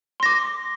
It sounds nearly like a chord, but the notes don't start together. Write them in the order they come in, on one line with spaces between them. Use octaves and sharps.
C6 A#6 D6